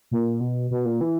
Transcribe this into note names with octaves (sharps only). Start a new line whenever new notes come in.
A#2
B2
B2
A#2
E3